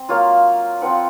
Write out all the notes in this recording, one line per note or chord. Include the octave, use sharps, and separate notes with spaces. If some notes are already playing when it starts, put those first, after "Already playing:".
Already playing: C4
F#3 A#3 F4 F5
F3 C4 F4 F#5